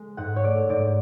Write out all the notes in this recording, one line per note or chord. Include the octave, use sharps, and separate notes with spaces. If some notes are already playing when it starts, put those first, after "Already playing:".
Already playing: G#3
G#2 F#5
C#5
A3 D5
G#2 D5